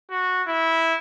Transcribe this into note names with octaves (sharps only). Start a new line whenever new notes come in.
F#4
E4